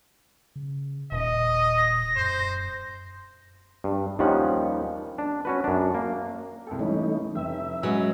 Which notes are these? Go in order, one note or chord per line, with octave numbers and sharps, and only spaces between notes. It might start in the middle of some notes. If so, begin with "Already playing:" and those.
C#3
D#1 A#2 D#5
A#6
F#2 C5
G2
D#2 D#3 F3 G3 C#4 F#5
D4
C#4 F#4 B4
F#2 D4
A#3
C2 A4 G5
E3 G3 A3 C#4 D#4
F1 E5 G5
F#3 G#3 C#4 B4